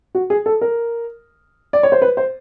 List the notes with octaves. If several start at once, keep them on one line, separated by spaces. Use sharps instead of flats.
F#4
G#4
A4
A#4
D5
C#5
C5
B4
C5